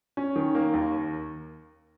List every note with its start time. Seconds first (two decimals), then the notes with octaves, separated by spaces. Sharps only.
0.17 C#4
0.36 D#3
0.55 A#3
0.74 D#2